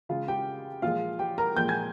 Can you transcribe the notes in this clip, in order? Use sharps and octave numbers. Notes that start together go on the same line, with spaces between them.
C#3 G#3 F4 F5
G4 G5
A#2 F3 G#3 F4 F5
G4 G5
A#4 A#5
A#2 F3 G#3 G5 G6
G#5 G#6